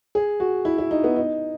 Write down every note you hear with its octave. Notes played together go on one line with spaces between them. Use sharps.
G#4
F#4
E4
E4
D#4
B3
D#4